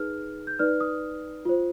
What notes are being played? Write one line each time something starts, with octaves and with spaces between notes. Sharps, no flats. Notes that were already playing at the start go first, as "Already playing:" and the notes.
Already playing: D#4 G#4 B4 F6
G6
D#4 B4 D5 F6
D#6
F4 C5